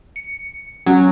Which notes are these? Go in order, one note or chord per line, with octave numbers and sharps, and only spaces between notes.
C#7
F#3 C#4